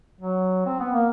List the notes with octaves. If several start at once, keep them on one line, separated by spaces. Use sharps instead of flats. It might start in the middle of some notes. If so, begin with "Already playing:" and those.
F#3
C4
B3
A#3